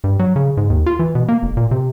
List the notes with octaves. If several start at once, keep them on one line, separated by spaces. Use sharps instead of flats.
G2
F#3
C#3
G#2
D#2
F4
E3
B2
A#3
F1
A#2
C3